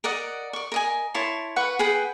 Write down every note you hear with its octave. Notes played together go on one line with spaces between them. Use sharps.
A#4 D5 D#5 F#5
D5 C#6
A#4 D#5 G#5
E4 C#5 A5 C6
B4 F#5 C#6
G#4 B4 F#5 G5